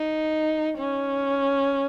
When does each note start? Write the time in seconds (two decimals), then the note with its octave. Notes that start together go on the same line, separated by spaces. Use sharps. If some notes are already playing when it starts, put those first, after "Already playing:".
Already playing: D#4
0.78 C#4